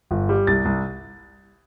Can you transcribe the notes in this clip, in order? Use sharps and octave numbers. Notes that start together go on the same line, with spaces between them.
G1
G3
C2 A6
C2